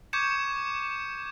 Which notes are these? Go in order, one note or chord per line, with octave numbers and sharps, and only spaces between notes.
C#6 D6 G6 G#6 C#7 E7